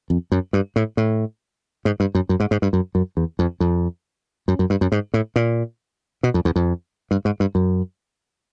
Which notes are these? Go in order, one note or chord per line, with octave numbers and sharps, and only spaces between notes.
F2
F#2
G2
A2
A2
G#2
G2
F#2
F#2
G#2
G#2
G2
F#2
F#2
E2
F2
F2
F#2
F#2
G2
F#2
G#2
A2
A#2
B2
F2
E2
F2
G2
G#2
G2
F#2